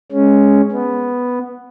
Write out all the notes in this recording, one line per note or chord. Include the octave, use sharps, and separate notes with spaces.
G#3 C#4
B3